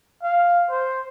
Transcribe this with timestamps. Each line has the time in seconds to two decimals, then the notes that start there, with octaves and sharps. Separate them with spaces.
0.23 F5
0.70 C5